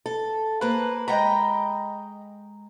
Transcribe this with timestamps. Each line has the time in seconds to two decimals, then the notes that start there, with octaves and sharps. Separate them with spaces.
0.06 A4
0.61 A#3 B4 C5
1.08 G#3 D#5 G5 A#5 B5